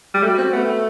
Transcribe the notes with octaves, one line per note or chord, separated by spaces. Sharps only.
G3
A3 F#4
C4
A3 B3